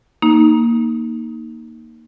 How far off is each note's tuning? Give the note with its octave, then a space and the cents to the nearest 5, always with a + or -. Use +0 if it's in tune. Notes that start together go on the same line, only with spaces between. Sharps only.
A#3 +0 D#4 +0